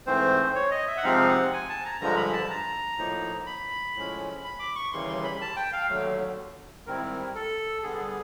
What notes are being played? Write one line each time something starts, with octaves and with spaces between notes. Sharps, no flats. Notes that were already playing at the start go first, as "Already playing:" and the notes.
G#2 E3 A3 C4 C5
C#5
D#5
E5
F#5
C3 F3 G#3 C4 D#4 F5
F#5
G#5
A5
A#5
G2 D3 F3 G#3 A#5
B5
A5
A#5
A2 F3 A#3 D#4
B5
A2 F3 G#3 C#4
B5
D6
C#6
D#2 C#3 E3 G3 A#3 C6
C6
B5
A5
G5
F5
D#2 D3 F#3 A3
G#2 D#3 G3 C4 E4 A#4
A4
D3 G3 B3 G#4